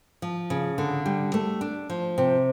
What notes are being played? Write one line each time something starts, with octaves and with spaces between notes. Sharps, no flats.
F3
C#3
D3
G3
A3
D4
F3
C3